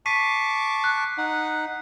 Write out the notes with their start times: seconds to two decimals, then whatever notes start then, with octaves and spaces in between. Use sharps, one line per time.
0.06 A5 C#6 D6 B6 C7 D#7
0.84 F#6
1.18 D#4 F#5